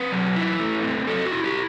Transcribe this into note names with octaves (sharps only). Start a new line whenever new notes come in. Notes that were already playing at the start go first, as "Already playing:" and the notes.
Already playing: C4 B4
F#3
E4
A3
C4
F#3 A4
F#4
E4
G4